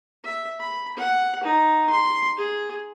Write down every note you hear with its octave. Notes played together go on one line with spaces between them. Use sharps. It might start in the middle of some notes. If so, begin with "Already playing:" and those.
E5
B5
F#5
D#4
C6
G#4